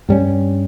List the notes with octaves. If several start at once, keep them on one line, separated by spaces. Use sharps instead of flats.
G2 G3 C#4